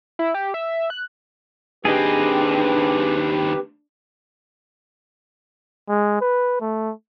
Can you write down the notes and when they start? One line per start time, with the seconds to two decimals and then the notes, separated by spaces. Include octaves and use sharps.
0.19 E4
0.34 G4
0.54 E5
0.90 F#6
1.85 D#2 C4 D4 G4 G#4 B4 D#5
5.89 G#3
6.21 B4
6.61 A3